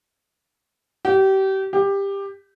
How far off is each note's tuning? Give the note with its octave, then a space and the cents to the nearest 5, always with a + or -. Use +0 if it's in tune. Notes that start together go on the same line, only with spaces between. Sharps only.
G4 -30
G4 +15